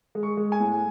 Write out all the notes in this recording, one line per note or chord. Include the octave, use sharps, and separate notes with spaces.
G#3
C#6
G#3
G#5
A2